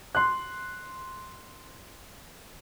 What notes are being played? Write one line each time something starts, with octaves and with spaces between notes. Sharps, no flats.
C6 F#6